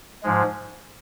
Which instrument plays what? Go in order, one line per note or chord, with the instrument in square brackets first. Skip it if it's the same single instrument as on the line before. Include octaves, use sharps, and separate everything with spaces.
[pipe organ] G#2 F3 G#3